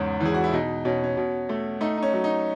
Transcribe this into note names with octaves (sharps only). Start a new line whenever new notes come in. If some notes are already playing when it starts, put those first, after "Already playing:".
Already playing: E2 G#2 C#3 C#4
E3 G#4
F#4
E4
B2 D#4
B2 C#4
C#4
B2
A3
A3 D#4
D#4
C#4
F#3
D#4